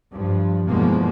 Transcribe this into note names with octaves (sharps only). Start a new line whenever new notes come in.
G2 F3
G1 E2 B2 F3 G#3 A#3